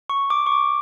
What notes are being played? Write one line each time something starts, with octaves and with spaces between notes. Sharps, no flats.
C#6
D6
C#6
D6